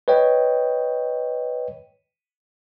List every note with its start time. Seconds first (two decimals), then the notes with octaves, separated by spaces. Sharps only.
0.08 B4 C#5 D#5 G5